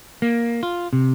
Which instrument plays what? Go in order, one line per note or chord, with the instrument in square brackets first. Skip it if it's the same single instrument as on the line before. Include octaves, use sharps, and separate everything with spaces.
[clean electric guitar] A#3
F4
C3